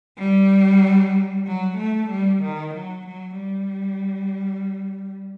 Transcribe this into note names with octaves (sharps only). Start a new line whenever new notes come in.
G3
F#3
A3
G3
D#3
F#3
F#3
G3